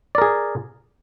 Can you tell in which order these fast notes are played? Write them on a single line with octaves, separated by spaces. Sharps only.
D5 A#4 G#4